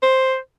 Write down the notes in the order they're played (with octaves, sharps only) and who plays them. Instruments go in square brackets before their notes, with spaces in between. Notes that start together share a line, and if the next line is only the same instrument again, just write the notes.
[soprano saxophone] C5